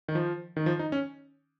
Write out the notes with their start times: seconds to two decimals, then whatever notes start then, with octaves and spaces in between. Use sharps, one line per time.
0.08 D#3
0.15 F3
0.56 D#3
0.66 F3
0.79 D#4
0.92 C#4